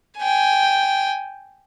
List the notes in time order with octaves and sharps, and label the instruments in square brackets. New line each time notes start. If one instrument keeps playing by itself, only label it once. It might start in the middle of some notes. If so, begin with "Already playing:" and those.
[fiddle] G5 G#5